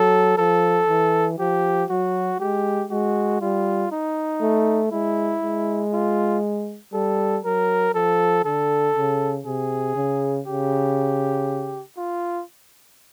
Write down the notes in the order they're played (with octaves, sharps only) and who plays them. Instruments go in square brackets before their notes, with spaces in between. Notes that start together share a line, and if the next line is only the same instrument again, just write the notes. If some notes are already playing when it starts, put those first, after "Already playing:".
Already playing: [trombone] F#3 [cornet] A4
[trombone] F3 [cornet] A4
[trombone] E3
[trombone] F3 [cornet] G4
[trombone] F#3 [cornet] F#4
[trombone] G#3 [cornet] G4
[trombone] G#3 [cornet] F#4
[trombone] G3 [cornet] F4
[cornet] D#4
[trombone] A3
[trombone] G#3 [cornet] E4
[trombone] G#3
[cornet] F4
[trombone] G3 [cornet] A4
[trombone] F#3 [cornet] A#4
[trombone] F3 [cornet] A4
[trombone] D3 [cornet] A4
[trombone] C#3
[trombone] C3 [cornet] G#4
[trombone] C#3
[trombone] C#3 [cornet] G4
[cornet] F4